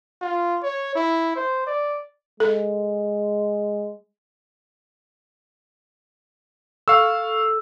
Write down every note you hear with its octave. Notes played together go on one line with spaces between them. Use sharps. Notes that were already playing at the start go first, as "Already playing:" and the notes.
F4
C#5
E4
C5
D5
G#3 A4
A4 F5 C#6 E6